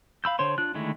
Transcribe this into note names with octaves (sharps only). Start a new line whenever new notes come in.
F5 B5 E6 G6
D3 C5 C#5 C6
D4 F4 F#6
D3 D#3 G#3 A3 E4